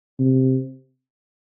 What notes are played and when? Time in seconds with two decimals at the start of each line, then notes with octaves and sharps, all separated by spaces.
0.19 C3